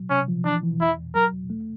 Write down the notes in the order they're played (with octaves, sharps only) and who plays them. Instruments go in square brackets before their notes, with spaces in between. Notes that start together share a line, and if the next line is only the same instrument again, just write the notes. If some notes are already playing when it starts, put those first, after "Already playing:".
Already playing: [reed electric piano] F#3
[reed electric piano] C3 [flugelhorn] C#4
[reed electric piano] F3
[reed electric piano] E3 [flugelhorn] D4
[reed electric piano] E3
[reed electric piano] E2 [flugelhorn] E4
[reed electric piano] E2
[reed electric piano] F#3 [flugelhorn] A#4
[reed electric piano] E2
A3